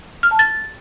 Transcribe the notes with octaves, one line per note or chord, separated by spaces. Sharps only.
F6
A5
A6